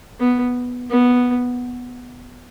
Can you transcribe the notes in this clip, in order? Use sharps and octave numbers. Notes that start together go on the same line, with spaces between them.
B3
B3